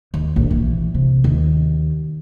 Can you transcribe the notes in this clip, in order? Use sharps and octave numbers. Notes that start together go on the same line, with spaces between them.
D#2
A#1
E3
C3
D#2